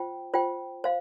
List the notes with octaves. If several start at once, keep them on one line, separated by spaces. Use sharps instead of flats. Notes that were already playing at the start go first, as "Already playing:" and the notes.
Already playing: F4 C5 G5
F4 C5 G5
C5 F5